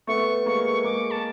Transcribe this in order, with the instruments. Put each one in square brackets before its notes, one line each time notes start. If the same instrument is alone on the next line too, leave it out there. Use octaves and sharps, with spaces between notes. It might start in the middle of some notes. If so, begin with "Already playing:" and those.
[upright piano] A3 B3 [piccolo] C#6
[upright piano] G#3 A#3 [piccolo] C#6
[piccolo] C#6
[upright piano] G#3 A#3 [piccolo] D6
[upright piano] A#3 [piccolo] A5